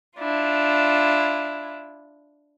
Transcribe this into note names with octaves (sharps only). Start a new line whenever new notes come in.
D4 E4 F4